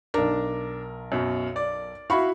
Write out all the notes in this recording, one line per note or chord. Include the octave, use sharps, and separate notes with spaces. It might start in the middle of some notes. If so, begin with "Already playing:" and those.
B1 D4 A#4
F#2 B2
D5
E4 F#4 F5 B5 C#6